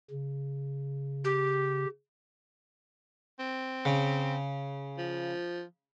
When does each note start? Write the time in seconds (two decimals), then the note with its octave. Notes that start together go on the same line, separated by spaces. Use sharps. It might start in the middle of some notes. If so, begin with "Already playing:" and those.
0.11 C#3
1.24 G4
3.40 C4
3.85 C#3
4.98 F3